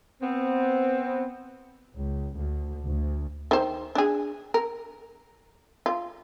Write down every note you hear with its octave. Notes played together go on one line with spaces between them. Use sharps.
B3 C4
C#2
D2
D2
D#3 C5
D4 G#4
A#4
F4